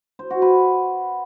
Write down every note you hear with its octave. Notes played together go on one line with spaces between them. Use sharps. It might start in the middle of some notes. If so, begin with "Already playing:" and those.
C5
F#4
B4